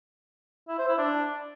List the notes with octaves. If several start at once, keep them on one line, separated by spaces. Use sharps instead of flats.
E4
C5
E4
D4